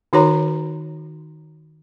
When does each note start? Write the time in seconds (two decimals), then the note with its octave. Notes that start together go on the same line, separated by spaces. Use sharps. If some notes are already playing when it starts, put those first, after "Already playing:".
0.13 D#3 D#4 F#4 A#4 C#5 A#5